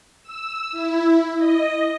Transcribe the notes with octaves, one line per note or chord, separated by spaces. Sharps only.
E6
E4
D#5